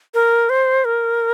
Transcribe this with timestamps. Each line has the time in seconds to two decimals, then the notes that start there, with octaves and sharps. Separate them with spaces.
0.14 A#4
0.50 C5
0.85 A#4